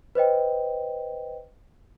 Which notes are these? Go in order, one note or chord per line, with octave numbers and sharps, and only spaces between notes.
B4 C5 D#5 G5